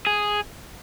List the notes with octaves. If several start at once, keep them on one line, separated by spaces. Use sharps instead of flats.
G#4